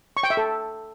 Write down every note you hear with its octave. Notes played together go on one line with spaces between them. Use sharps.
C#6
G5
E5
A4